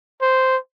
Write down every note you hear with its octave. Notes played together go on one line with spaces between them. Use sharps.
C5